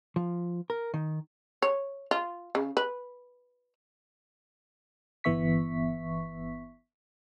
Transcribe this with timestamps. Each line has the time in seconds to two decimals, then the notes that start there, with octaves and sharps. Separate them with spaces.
0.16 F3
0.70 A#4
0.94 D#3
1.62 C#5
2.11 F4
2.55 C#3
2.77 B4
5.24 G1 E3 B3 E5 C#6 B6